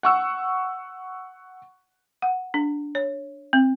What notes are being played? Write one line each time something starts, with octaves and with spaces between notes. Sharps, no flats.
F#5 C#6 E6
F#5
D4
C#5
C4